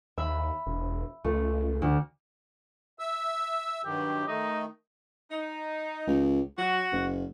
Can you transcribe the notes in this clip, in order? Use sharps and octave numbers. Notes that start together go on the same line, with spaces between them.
D#2 E5 B5
E1
C#2 A3
D2
E5 E6
G2 D#3 F#3 G4
D#3 A3 D#4
D#4
C#2
F#3 F#4
F#1